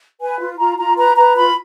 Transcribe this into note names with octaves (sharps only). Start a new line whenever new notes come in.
B4 G#5
F4
F4 A#5
F4 A#5
B4 A#5
B4 A#5
F4 B5